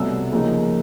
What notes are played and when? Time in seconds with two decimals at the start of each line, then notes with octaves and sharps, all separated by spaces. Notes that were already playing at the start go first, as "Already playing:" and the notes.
Already playing: C2 B2 F#3 A3 E6
0.32 D#2 C#3 F3 A#3 D#4